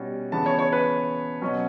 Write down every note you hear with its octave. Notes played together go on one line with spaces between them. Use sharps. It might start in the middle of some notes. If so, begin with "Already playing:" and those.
Already playing: B2 G3 C#4
C#3 E3 B3 A5
C#5
C#5
B4
B2 F#3 C#4